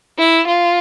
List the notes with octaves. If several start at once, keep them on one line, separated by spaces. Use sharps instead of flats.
E4
F4